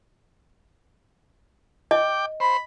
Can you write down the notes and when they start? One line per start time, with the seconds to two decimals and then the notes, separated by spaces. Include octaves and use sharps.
1.91 D#5 G5 D6
2.40 C5 B5